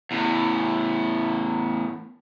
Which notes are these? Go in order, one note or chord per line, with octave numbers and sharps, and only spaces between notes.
E2 A2